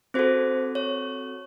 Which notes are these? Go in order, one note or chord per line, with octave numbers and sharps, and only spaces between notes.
C4 F#4 A4 C5
C#5